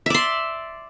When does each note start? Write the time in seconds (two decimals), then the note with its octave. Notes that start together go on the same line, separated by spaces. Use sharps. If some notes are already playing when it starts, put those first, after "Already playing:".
0.06 E5
0.10 D5
0.14 C6